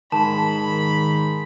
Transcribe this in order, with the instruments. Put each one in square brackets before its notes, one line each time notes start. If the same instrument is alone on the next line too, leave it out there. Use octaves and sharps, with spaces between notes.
[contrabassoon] G#2 [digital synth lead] D#3 [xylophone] A5 [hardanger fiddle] B5